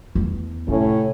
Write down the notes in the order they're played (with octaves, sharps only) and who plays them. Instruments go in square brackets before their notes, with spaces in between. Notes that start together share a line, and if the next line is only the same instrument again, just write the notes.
[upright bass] E2 B3
[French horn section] A2 C#4 [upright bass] C3